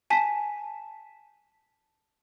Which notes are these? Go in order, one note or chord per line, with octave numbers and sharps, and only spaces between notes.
G#5 A5 B6